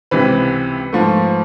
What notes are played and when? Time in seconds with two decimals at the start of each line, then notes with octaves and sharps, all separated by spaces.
0.11 C#2 C3 E3 B4
0.93 G#2 F3 A3